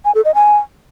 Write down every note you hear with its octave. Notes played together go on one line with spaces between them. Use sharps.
G#5
A4
D#5
G#5